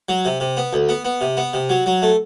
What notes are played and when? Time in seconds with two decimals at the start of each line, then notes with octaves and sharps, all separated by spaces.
0.09 F#3
0.25 C3
0.40 C3
0.57 B3
0.73 D2
0.89 B3
1.05 B3
1.21 C3
1.37 B3
1.53 C3
1.69 F#3
1.86 F#3
2.02 A3